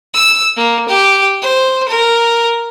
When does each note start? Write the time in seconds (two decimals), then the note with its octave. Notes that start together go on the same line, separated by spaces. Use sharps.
0.14 E6
0.56 A#3
0.88 G4
1.42 C5
1.88 A#4